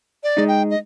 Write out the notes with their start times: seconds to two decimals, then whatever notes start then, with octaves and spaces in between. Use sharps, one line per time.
0.24 D5
0.37 G#3 D#4
0.48 G5
0.71 D#5